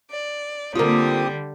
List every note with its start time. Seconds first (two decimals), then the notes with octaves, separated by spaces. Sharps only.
0.11 D5
0.75 D3 G3 A#3 C4 F4 G4 D#6